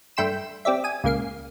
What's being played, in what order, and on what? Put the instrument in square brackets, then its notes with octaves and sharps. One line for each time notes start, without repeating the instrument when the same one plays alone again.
[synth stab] G2 A3 G5 C6 B6 E7
C4 G4 D5 E5
G#5 D#6
C#2 A#2 C#3 A#3 F5 C7